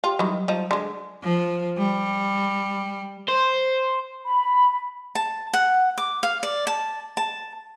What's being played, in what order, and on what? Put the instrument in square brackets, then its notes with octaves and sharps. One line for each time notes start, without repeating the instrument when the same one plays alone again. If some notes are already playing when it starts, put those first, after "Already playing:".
[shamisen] F4 [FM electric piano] G4 C6
[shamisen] D#3 E3 [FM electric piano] F#3 G3
[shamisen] F3 D#4
D3 G#3
[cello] F3
G3
[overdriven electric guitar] C5
[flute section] B5
[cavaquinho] A5
F#5
D6
F5
D5
A5
A5